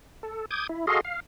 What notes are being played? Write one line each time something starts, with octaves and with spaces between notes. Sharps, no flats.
A4
D6 D#6 G6 G#6
E4
F#4 G#4 A4 D#5 F5 C6
F5